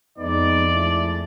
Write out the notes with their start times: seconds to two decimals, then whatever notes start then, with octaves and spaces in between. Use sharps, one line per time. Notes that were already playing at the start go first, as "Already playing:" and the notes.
0.18 F2 G#3 B3 D#4 D5
0.73 G#3 A3 E4